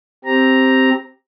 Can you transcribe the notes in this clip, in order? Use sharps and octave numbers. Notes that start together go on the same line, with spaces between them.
C4 G4 A#5